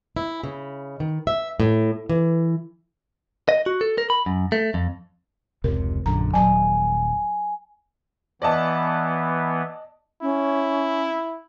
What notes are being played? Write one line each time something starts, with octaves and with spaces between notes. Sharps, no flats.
E4
C#3
D#3
E5
A2
E3
D#5
F#4
A4
A#4
B5
F#2
A3
F2
F1 C#2 C3 A#4
A#1 F#2 D3 A#5
D#1 F#3 G#5 A5
E3 B3 D5 D#5 A5
C#4 E4